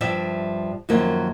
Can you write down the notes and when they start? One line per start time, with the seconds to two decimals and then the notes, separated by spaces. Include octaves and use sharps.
0.01 G2 F3 G3 D5 E5 G5
0.89 F#2 D#3 F3 F#3 A#3